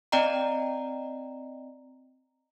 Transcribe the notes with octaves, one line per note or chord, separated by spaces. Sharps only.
C4 D5 D#5 G5 A#5